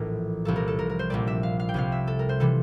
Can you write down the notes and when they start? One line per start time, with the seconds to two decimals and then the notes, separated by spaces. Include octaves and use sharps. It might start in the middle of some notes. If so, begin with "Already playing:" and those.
Already playing: A#1 A2 E3 A#4
0.45 C2 A#2 F3 A4
0.56 A#4
0.68 A4
0.79 A#4
0.90 A#4
0.99 C5
1.10 A#1 A#2 G3 D5
1.27 E5
1.43 F5
1.60 F5
1.69 G5
1.74 C2 C3 G3 F5
1.92 E5
2.07 A4
2.19 A#4
2.29 C5
2.40 C3 E3 G3 A4